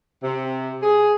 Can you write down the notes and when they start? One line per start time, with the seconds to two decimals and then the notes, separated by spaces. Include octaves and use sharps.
0.23 C3
0.83 G#4